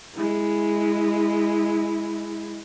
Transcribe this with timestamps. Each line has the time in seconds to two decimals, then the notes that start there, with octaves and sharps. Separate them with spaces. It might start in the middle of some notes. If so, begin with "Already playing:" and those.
0.15 G#3 E4